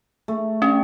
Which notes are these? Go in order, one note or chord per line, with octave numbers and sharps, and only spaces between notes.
A3
C#4 D4 G4